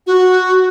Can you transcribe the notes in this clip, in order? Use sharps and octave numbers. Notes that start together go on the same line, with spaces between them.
F#4